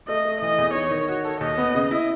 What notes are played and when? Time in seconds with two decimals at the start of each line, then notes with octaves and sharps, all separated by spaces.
0.08 A3 D#5
0.25 A3
0.41 E3 D#5
0.58 E2
0.75 D#4 C#5
0.91 D#3
1.08 F#4
1.25 A4
1.41 D#2 D#5
1.58 B3
1.75 C#3
1.91 E4